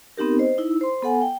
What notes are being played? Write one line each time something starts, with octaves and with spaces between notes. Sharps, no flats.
B3 C4 D#4 G4 A#4
C5 D#5
D#4 E4 E6
C5 C6
B3 A4 F#5 G#5
G5